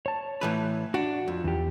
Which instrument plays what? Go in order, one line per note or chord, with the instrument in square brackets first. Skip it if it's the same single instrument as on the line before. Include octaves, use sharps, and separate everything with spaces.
[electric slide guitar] C#5 A5
[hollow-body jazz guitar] A2 E3 B4
[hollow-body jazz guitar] D4 [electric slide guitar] F#4 F#5
[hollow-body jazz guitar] F2
[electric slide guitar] E2 G4